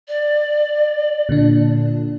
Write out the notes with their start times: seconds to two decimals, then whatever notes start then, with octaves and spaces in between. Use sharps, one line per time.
0.08 D5
1.29 A#2 D3 D4